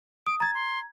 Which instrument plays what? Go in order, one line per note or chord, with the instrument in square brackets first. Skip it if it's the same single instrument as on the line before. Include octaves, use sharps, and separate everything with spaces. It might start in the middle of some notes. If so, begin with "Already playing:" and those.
[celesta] D#6 [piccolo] D7
[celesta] A#5 G#6 [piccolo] A6
[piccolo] C6